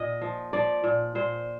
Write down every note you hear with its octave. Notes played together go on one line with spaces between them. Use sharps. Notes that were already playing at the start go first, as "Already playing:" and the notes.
Already playing: A#2 D#5
F3
F3 D5
A#2
A#2 C5